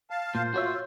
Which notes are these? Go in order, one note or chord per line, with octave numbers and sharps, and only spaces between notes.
F5 A5
A#2 C5
F4 F#4 C#5 E5